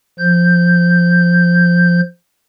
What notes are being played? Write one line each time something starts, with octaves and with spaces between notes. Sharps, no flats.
F3 G6